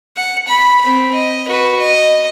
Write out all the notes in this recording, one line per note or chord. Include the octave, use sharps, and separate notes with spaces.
F#5
B5
C4 B5
D#5
F#4 B4
D#5